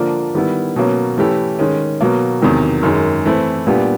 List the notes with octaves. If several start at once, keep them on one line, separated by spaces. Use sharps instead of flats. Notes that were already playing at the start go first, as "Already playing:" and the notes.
Already playing: D3 F3 A#3 D4 F4
D#3 G3 B3 E4
B2 F#3 A#3 C#4
E3 A3 C#4 E4 G4
D#3 G#3 C#4
B2 F#3 A#3
E2 C3 D#3 F#3
F#2 D#3 G#3
E3 A3 C4 E4
A#2 G3 B3 D4 G4